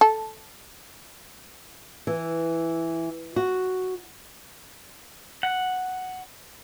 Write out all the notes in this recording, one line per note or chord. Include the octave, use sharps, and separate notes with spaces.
A4
E3
F#4
F#5